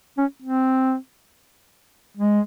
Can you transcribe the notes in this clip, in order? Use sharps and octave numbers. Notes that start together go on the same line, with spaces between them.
C#4
C4
G#3